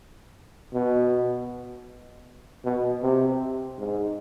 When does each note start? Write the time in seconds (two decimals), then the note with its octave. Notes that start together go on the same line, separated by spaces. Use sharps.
0.74 B2
2.65 B2
3.02 C3
3.79 G#2